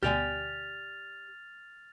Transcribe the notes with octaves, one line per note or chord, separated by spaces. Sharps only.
D2 B2 G4 D5 G#5 F6 A6 F7